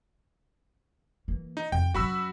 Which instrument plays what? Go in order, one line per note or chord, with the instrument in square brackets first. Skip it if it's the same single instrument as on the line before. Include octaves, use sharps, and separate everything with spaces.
[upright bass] E3 A#3
[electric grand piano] D#4
[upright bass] F2 [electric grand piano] G5
[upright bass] F#2 F#3 [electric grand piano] F#4 B5 E6